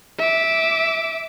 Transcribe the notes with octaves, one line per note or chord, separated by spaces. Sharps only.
E5 D6